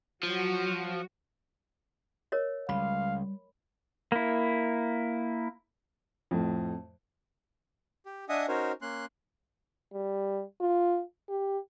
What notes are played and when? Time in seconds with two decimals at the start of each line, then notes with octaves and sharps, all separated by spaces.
0.23 F3 F#3 F#4
2.32 A#4 C#5 D#5
2.69 C#2 G3 F5 B5
4.12 A#3 E4
6.31 F2 A2
8.06 G4
8.29 D4 D#5 E5 F#5 G#5 D#6
8.48 C#4 D#4 F#4 A#4 C5 C#5
8.82 A#3 C#4 C6 F#6
9.93 G3
10.60 F4
11.29 G4